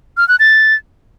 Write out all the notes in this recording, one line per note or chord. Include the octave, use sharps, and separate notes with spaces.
F6
F#6
A6